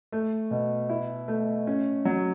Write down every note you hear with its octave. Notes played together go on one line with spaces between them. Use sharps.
A3
B2
E4
A3
C#4
F#3